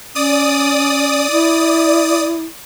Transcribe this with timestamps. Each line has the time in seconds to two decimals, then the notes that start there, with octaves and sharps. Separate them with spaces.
0.15 C#4 D5 D#6
1.31 E4